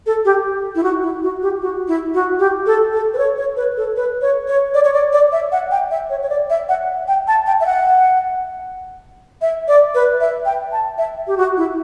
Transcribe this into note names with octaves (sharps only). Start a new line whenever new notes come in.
A4
G4
E4
F#4
E4
F#4
G4
F#4
E4
F#4
G4
A4
A4
B4
C#5
C#5
B4
A4
B4
C#5
C#5
D5
C#5
D5
D5
E5
F#5
G5
E5
C#5
C#5
D5
E5
F#5
G5
A5
G5
E5
F#5
E5
D5
B4
E5
G5
A5
E5
G4
F#4
E4